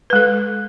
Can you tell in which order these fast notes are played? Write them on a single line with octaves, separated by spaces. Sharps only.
B4 G#3 A4